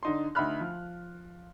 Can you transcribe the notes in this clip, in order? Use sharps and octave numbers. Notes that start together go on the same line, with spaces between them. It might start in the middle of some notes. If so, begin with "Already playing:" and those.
D3 D#4 C6
D2 D#4 E5 B5 F6 F#6
F3